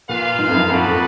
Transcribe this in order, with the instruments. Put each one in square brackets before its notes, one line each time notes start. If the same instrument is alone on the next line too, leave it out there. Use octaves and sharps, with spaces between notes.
[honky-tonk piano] A#2 [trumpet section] A#3 F4 B4 F5
[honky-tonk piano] G#2
F2
F#2
[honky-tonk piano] F2 [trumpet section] D#4 F#4 B4 D5 F#5